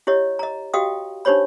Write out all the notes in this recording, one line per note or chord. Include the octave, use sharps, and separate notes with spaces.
E4 G4 C#5 D#5
D#5 A#5
F#4 G4 D#5 F5 G5 D#6
D4 D#4 G4 C5 C#5 B5